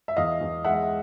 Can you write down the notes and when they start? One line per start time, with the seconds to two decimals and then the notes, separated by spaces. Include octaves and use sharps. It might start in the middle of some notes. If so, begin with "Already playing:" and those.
0.08 E5
0.17 E2 D#5 F5
0.41 E2
0.64 G#3 E5 F#5